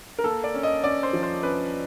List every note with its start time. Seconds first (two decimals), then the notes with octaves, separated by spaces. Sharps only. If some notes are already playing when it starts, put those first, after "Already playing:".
0.19 A#4
0.24 A#3 A4
0.44 D5
0.54 C#4
0.63 D#5
0.84 C#4 D5
1.03 C5
1.13 F3
1.23 C5
1.43 C#4 B4